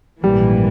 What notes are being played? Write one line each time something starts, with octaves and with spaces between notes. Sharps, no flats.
A#1 G#2 E3 G3 A#3